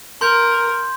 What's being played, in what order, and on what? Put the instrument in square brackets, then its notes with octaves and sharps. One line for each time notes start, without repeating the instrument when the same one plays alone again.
[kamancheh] A#4 [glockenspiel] C6 G6